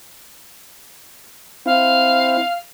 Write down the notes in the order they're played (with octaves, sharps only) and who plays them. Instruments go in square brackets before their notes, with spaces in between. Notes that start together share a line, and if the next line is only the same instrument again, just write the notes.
[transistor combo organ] C4 E4 [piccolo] F5